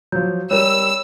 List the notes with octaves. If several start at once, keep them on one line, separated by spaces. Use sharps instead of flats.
F3 F#3 G6
G3 A#4 C#5 E6